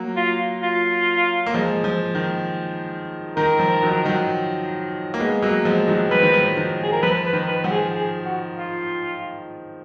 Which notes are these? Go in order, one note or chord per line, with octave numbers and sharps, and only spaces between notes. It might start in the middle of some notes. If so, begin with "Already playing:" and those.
Already playing: F#3 A#3
F4
F4
A#3
F3 G#3
F3
D#3
D#3 A#4
F3
D#3 F#3
D#3 F#3
A#3
G#3 B3
F#3 A#3
F3 G#3
D#3 F#3
F3 B4
D#3
F3
D#3
G#4
A#4
F3 B4
B4
D#3
B4
F3 F#4
G#4
G#4
F#4
F4